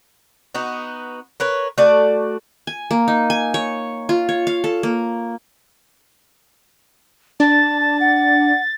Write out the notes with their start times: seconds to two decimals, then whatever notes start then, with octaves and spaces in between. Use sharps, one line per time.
0.55 B3 D#4 F#4
1.40 A#4 B4 C#5
1.78 A3 F#4 D5 A5
2.67 G#5
2.91 A#3
3.08 D#4
3.30 G#5
3.54 C#5
4.09 F4
4.29 C#5
4.47 F5
4.64 A4
4.83 A#3
7.40 D4 A5 A6
7.80 A5
8.00 F#5